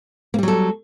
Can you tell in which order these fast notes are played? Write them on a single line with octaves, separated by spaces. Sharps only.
A#3 G3 F#3 A4